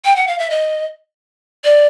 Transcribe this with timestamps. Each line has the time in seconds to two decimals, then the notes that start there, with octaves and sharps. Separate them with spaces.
0.05 G5
0.16 F#5
0.27 F5
0.39 E5
0.50 D#5
1.64 D5